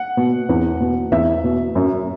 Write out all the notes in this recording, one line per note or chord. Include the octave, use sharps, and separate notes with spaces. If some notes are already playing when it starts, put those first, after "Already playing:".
Already playing: F#5
B2
E2
B2
E2 E5
B2
F#2